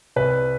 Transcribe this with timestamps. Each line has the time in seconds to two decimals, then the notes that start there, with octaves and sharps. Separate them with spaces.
0.16 C2 B4